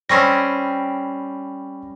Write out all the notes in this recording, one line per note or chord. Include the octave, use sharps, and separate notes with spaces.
G3 C4 C#4 B5 C#6 A#6